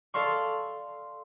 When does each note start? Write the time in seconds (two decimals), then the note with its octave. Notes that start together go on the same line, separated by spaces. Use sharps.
0.14 A4 D5 F5 C6 C#6